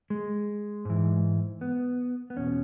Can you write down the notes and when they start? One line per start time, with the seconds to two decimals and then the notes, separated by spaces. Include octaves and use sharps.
0.10 G#3
0.85 G#2 E3
1.61 B3
2.30 B3
2.36 E2 B2 C#4